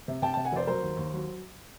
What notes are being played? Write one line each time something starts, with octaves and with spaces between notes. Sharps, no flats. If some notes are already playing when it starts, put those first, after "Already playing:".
C3
C3 G5 A5
G5 A5
C3
F#5 G#5
F1 C5 D5
F#3 A#4 C5
D#2
D#2
F#3